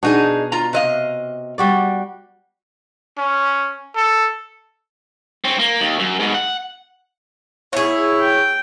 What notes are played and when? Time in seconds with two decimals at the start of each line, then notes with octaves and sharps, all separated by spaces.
0.03 B2 D4 D#4 G#4
0.52 F4 A#5
0.73 C3 D#5 F5
1.58 G3 F#4 D5
3.18 C#4
3.96 A4
5.44 C4 C#4
5.59 A#3
5.80 D#2
5.99 F#2
6.20 G#2 B2
6.34 F#5
7.73 B2 E4 G#4 C#5
8.20 G5